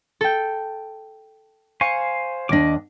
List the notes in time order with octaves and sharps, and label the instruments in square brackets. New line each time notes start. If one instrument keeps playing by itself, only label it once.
[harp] A4 G5
[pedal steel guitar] C5 F5 G#5 [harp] C#6
[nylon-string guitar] D#2 D4 [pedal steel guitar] D#5 D6